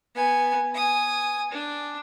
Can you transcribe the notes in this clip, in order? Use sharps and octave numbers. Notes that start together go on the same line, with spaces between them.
B3 G#5
G#5 D#6
D4